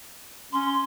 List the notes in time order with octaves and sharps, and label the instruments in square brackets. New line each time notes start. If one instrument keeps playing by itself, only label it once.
[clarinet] C#4 [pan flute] C6